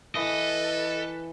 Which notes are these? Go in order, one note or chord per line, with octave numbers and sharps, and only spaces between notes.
E3 A4 B4 D#5